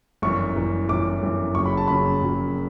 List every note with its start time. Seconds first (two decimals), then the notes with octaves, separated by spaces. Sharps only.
0.22 G1 F#2 E3 C#6
0.55 G1 F#2 E3
0.88 G1 F#2 E3 D6
1.22 G1 F#2 E3
1.55 F#1 F#2 C#3 F#3 C#6
1.66 B5
1.77 A5
1.88 F#1 F#2 C#3 F#3 B5
2.22 F#1 F#2 C#3 F#3